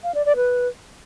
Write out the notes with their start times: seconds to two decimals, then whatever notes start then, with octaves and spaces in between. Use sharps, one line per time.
0.03 F5
0.14 D5
0.25 D5
0.36 B4